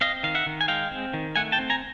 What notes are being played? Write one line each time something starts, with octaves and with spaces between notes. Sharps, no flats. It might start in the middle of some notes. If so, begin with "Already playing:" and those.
C4 D#5 F5
D#3 F5
E5 F#5
D#3
G#5
G#3 F5 G5
C4
D#3
A3 F#5 G#5
G5 A5
C4
G#5 A#5